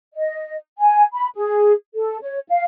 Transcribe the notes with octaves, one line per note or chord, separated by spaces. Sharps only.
D#5
G#5
B5
G#4
A4
C#5
F5